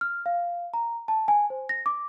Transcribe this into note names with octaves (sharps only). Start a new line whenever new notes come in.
F6
F5
A#5
A5
G#5
C5
A#6
D6